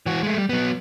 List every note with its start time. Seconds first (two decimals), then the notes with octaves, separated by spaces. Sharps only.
0.06 E3 F#4
0.23 G#3 A3
0.38 G3
0.49 F#3 B3